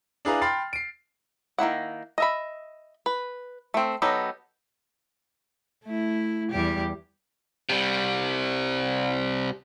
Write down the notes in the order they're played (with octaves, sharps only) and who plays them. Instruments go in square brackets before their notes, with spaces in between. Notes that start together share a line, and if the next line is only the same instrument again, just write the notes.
[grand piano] D4 E4 G#4 B4 F5 A#5
G5 B5 C6 F6 A6 C7
C7 D7
[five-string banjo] D#3 A#3 E4 F#5
D#5 E5 B5
B4
A3 C4
F#3 B3 D#4 G4 A4
[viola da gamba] A3 E4
E2 G3 G4
[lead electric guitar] C3 G3